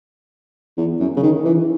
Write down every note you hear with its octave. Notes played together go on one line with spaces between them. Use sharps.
E2
F#2
C#3
D#3
E3